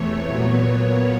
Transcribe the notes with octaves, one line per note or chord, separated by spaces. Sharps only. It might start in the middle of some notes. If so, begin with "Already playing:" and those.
Already playing: E2 C3 E3 A3 C#5
A#2 F#3 B3